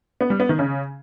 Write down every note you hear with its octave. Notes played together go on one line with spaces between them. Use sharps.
B3
G3
B3
D#3
C#3